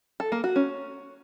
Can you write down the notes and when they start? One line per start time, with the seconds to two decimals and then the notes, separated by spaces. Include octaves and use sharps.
0.20 A4
0.32 A#3
0.44 F#4
0.56 C#4